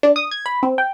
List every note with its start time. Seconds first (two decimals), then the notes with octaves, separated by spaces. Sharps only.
0.03 D4
0.16 D#6
0.31 G#6
0.46 B5
0.63 C4
0.78 G5